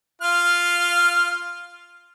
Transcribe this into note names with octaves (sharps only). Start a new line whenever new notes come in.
F4 F6